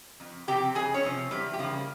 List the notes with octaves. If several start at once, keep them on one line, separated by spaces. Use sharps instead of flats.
F2
C3 F3 C4 G4 G5
F2 G#4 G#5
C#4 C#5
C3 F3 C4
E2 G3 G4
G4
C#3 F3 G3 A#3 F4